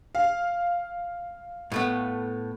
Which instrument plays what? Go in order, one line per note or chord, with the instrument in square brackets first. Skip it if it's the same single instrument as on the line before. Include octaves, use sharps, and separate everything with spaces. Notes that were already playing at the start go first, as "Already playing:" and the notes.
[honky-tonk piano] F5
[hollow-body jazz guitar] A2 A3 B3